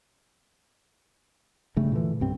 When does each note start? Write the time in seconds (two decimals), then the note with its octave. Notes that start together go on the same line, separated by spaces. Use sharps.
1.76 G2 C#3 A3
1.92 A#2 D3 E3
2.20 C2 G2 C4